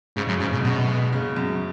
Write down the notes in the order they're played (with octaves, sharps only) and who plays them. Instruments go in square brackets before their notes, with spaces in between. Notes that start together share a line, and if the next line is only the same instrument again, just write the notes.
[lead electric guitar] G#2 [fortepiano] C#3
[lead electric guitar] F#2
[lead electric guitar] G#2 [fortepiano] C#3
[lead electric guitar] B2
[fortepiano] F#2 [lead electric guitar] B2
[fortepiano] G#3
C#3
F#2